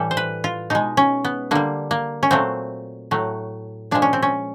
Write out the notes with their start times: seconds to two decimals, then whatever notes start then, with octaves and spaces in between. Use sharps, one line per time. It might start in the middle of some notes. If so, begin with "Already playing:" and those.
Already playing: A2 E3 G3 A4
0.11 C5
0.17 B4
0.44 F4
0.70 B2 G#3 D#4
0.97 C#4
1.24 B3
1.51 D3 G3 A#3
1.91 A#3
2.23 C#4
2.31 A#2 F#3 A3 C4
3.11 A2 F#3 A3
3.91 A#2 F3 G#3 D4
4.02 C#4
4.13 C4
4.22 C#4